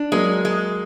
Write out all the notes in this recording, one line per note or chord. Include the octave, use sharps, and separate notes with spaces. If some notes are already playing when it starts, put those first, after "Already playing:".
Already playing: D4
F#3 G#3 A#3
G#3